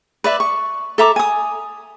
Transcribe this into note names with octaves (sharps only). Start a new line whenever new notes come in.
B4 D5 E5
C#6
A4 E5 A#5 D6
G#5 D#6